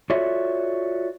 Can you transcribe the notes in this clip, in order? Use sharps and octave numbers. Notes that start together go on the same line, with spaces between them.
F4 F#4 A4 C#5 D5 E5